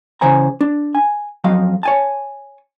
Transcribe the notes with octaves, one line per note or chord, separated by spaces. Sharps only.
C#3 E3 C5 G#5 A#5
D4
G#5
F2 F#3 D#5 F5
C#5 G#5 A5